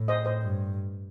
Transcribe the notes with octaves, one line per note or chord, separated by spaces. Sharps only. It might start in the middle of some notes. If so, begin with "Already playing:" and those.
Already playing: A2
C5 D#5
C5 D#5
G2